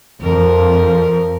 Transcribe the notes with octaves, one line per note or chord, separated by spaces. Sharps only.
F2 F3 A#4